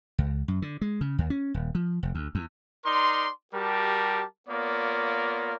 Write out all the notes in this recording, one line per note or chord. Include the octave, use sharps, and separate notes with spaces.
C#2
F#2
D3
G#3
C#3
D#2
C#4
D#1
F3
F1
D2
E2
D#4 A#4 D5 C6
G3 F#4 G4 A#4 A5
A#3 B3 F4 A#4 C#5 D5